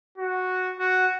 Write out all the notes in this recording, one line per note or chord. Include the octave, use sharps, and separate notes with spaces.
F#4
F#4